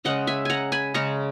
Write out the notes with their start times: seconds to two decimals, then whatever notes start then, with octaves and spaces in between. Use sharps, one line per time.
0.05 C#3 G#3 C#4 D#5 F#5
0.27 E5 G#5
0.45 F#5 G#5 A#5
0.72 G#5 B5
0.94 C#3 G#3 C#4 A#5 C#6